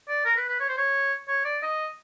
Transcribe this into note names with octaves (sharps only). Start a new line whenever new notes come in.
D5
A#4
B4
B4
C#5
C5
C#5
C#5
D5
D#5